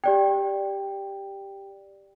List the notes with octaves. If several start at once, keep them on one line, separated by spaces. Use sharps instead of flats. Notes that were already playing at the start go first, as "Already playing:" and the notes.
G4 D5 G5